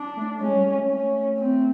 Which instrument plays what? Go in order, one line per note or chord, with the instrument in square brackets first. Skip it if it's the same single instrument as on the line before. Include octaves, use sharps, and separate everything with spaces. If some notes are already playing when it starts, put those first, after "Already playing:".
Already playing: [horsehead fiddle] D4
[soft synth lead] A3
[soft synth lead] G#3 [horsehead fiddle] C#4
[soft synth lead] G3
G#3
A3
[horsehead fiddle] C#4
C4